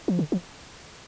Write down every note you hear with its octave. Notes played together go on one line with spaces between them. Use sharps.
F3
D3
F3